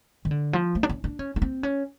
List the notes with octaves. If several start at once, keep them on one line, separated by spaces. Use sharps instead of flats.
D#3
D3
F3
A3
D4
C#4
D4
C#4
C#4
C4
C#4